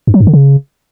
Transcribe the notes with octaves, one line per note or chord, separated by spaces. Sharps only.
G2
F#3
G2
D3
C#3